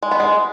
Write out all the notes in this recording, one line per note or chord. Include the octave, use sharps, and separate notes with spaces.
G#3
B3
G#3